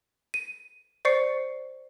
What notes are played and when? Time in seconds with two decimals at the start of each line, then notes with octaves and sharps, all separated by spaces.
0.34 D#7
1.05 C5 D5 C#6 C7 C#7